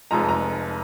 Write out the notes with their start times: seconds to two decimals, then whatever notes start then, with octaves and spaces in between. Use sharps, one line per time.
0.11 F1 F2 F3 G#3 A#5
0.29 A#5